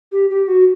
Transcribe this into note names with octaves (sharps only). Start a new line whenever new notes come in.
G4
G4
F#4